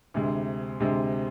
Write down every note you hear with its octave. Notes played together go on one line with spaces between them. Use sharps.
D2 C3 G#3
D2 C3 G#3